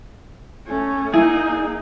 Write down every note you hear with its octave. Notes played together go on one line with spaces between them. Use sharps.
A3 C#4
A#3 D#4 E4 G#4 G#5